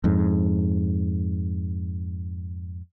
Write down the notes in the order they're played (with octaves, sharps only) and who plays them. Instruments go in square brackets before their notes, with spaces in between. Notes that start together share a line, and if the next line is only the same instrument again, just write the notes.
[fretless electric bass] F2 G#2